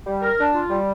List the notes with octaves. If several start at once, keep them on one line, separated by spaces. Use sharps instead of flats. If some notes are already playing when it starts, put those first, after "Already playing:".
G3
A#4
D4
F4
G3